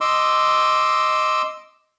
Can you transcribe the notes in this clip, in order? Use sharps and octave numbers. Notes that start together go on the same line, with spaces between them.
D#5 C6 D6 E6